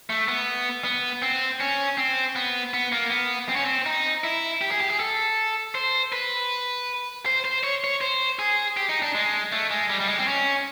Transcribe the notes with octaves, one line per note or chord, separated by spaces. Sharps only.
A3
B3
B3
C4
C#4
C4
B3
B3
A#3
B3
C4
C#4
C4
D#4
E4
G4
G#4
G4
G#4
A4
C5
B4
C5
C5
C#5
C#5
C5
G#4
G4
D#4
D4
G#3
A3
G#3
G3
G3
G#3
C4
C#4